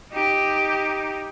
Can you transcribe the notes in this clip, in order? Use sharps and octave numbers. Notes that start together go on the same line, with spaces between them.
D#4 G4